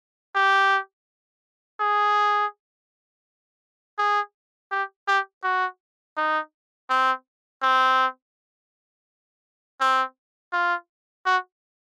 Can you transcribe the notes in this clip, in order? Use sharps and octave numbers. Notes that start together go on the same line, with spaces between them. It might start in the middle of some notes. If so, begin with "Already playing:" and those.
G4
G#4
G#4
G4
G4
F#4
D#4
C4
C4
C4
F4
F#4